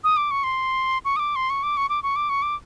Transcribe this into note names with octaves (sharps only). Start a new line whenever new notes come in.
D#6
D6
C#6
C6
C#6
D#6
D6
C6
C#6
D6
C#6
D6
C#6
D6
C#6
D6